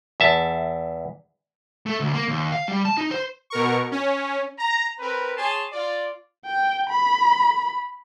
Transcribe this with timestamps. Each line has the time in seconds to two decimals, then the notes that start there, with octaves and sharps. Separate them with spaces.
0.20 E2 E5 A5
1.86 A3
2.00 D2
2.14 A#3
2.28 D#2
2.52 F5
2.68 G3
2.85 A5
2.97 D#4
3.11 C5
3.50 B2 A#4 C#6
3.92 C#4
4.59 A#5
4.99 C4 A#4 B4
5.37 G#4 C#5 G#5 A5 C6
5.72 F4 D5
6.46 G5
6.90 B5